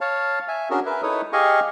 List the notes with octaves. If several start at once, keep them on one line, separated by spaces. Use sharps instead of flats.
C#5 F5 A5
E5 G#5
C#4 D4 F#4 G#4 A#4
A#4 B4 E5
D#4 E4 A4 B4 C#5 D#6
G4 G#4 D#5 F5 G#5 C#6